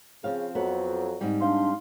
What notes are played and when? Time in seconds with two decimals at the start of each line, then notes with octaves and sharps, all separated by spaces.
0.24 C#3 F3 C4 F5
0.55 F2 F#3 B3
1.20 G#2 G3 C4
1.41 D4 F5 C6